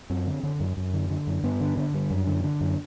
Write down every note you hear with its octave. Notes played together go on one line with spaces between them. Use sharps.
F#2 C4
D3
D3
F#2
F#2
D3
D3
F#2
G2 B3
D3
D3
G2
F#2
D3
D3
F#2